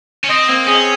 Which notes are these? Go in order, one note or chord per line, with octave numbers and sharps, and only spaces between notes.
C#4
C4 D#5
A#3 C4
C#4 G#4